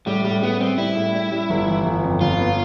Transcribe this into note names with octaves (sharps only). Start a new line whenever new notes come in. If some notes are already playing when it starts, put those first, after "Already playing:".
A2 G3
A2 G3
A2 B3
G3 C4
G3 E4
A2
G3
G3
G1
E3
G1
F2
G1 F4
B3